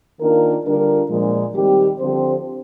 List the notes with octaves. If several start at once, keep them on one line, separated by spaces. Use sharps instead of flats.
D#3 A#3 D4 F4 A#4
D3 G3 D4 F4 A#4
A#2 F3 G#3
D#3 G3 C4 G4
D3 F3 C4 G4 C5